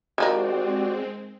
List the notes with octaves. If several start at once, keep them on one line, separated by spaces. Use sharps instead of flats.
D#3 F3 G#3 C4 F#4 G4 A#4 D5